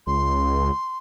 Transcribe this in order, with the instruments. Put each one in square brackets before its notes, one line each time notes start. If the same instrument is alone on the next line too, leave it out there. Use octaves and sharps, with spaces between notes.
[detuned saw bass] C#2 [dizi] C6